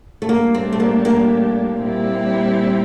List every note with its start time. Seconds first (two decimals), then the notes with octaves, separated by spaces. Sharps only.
0.22 A3
0.28 A2 G3 A#3 D4 G4
0.54 C4
0.72 A3
0.80 A#3
1.05 A#3
1.79 A#2 G3 C4 E4 G4